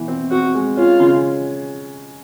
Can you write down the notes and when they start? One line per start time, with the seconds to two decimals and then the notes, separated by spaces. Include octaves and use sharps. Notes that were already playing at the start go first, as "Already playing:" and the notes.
Already playing: B2 E3
0.08 C4
0.31 C4 F#4
0.54 G#3
0.77 C#4 F4
1.00 C#3